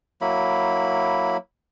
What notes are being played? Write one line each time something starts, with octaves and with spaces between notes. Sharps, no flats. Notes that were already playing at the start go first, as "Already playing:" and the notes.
F#3 A#3 E4 B5